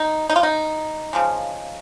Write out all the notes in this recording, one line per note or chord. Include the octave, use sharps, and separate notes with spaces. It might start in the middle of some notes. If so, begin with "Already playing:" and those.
Already playing: D#4
D#4
F4
D#4
C#3 F3 G#3